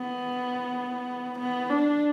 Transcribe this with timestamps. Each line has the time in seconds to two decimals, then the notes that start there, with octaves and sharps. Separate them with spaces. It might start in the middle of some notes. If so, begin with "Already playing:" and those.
Already playing: B3
1.39 B3
1.70 D4